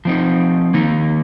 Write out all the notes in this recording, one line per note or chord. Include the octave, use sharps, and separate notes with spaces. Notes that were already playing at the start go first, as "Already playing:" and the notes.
F3 C4 D#4
D#3 A#3 D#4